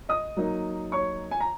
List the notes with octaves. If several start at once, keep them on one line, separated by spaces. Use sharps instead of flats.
D#5 D#6
F#3 A#3 D#4
C#5 C#6
G#5
A#5